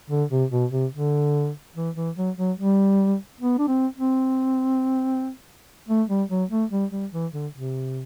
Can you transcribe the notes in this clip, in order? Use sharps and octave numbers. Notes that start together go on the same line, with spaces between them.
D3
C3
B2
C3
D3
E3
E3
F#3
F#3
G3
B3
D4
C4
C4
A3
G3
F#3
A3
G3
G3
E3
D3
C3